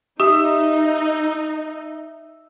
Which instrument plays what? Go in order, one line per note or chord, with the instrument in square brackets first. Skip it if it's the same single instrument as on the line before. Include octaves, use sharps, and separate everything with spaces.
[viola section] D#4 [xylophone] G4 [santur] E5 [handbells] D#6